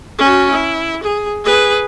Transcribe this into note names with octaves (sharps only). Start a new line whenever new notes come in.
C#4 F#4
E4
G#4
G#4 B4